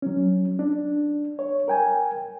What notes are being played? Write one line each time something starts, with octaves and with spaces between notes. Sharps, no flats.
F#3 C#4
D4
C#5
A#4 G5 G#5